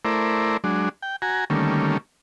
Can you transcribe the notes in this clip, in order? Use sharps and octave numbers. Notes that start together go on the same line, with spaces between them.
A3 E4 A#4 C5 D5
F#3 G#3 D4
G5
F#4 G#5 A#5
D3 D#3 G3 A3 A#3 C#4